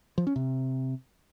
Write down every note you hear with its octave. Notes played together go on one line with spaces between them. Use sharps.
F3
C#4
C3